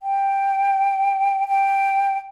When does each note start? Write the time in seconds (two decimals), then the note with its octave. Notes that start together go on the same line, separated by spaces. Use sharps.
0.03 G5
1.48 G5